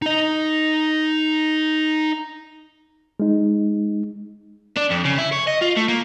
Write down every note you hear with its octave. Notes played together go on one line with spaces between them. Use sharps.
D#4 D#5
G#3 D#4
D4
F2
C#3
E4
C#5
D#5
F4
A3
A#3